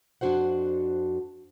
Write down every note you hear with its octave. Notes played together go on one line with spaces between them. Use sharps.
F2 D4 F#4 C5 F#5